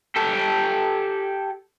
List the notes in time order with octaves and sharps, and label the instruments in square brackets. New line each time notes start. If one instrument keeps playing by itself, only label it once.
[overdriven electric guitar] G4 A4